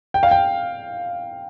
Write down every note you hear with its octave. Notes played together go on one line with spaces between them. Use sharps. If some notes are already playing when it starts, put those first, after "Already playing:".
G5
F5
G5